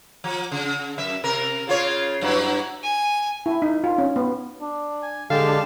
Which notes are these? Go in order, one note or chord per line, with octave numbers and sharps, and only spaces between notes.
F3
C#3
F#2 E5
C3 A#4
C#3 F4 C#5
G2 F#3 E4
G#5
E4
D#4
F4
C#4
B3
D4
G#5
D3 G#3 G4 F5 A5
D4